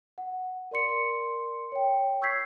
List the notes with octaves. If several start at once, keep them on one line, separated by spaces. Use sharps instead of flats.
F#5
A#4 D5 C6 C#7
C#5 G5
C#6 E6 G6 G#6 B6 C7